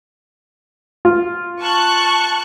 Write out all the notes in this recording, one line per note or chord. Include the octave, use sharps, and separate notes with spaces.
F4
A5 C#6 F#6